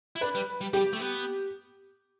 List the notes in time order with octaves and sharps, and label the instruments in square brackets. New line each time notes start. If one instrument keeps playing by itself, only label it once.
[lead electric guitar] E4
[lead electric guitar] D4 [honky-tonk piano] B4
[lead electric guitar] G3
G3
[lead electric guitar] G3 [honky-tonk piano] G4
[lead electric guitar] A3
B3